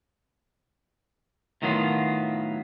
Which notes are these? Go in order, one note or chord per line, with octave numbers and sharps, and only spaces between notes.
A2 D#3 F#3 B3 F4